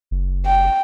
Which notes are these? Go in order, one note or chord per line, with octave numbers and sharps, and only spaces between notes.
F#1
G5